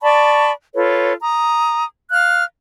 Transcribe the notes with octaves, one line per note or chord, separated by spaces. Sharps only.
D5 A5 B5 C#6
F4 A4 B4 C#5
A#5 D#6
F5 F6 F#6